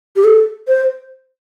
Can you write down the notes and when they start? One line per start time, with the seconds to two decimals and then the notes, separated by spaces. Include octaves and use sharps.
0.16 G4
0.24 A4
0.68 C5